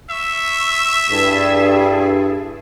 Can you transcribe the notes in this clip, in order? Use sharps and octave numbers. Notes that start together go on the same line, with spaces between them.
E5 C#6 E6
G2 E4 G#4 A4